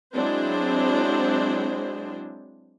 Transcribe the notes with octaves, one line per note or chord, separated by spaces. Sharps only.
F#3 G#3 C4 D4 E4 C5